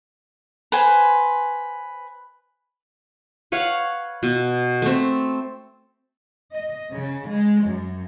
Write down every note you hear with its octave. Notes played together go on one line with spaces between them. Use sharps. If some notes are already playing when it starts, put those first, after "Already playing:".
B4 C5 G#5
B4 C#5 F5 F#5
B2
A3 C4
D#5
C#3
G#3
F#2